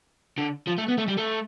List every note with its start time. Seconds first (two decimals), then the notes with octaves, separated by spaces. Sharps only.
0.38 D3
0.67 F3
0.78 A3
0.88 B3
0.98 A3
1.08 G3
1.17 A3